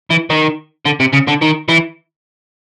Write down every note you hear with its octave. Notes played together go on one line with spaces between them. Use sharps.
E3
D#3
D3
C3
C#3
D3
D#3
E3